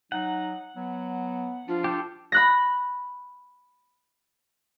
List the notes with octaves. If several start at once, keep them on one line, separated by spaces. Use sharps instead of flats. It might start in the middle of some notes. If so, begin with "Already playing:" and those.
F#3 D#4 F#5
F#3 B3
F3 D4 F4
D4 G4 A4
B5 F#6 A#6